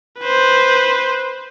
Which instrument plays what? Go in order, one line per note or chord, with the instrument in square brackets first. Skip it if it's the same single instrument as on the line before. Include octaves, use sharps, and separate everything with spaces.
[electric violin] B4 C5